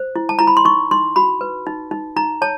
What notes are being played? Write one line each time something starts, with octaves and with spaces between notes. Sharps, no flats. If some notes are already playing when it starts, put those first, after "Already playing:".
Already playing: C5
E4
A5
E4 A#5
B5
C6
D#4 C#6
D#4 C6
F#4 B5
B4
D#4
D#4
D#4 A#5
C#5 A5